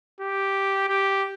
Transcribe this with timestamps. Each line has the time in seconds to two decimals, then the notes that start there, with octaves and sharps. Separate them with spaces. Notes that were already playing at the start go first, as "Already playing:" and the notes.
0.21 G4
0.89 G4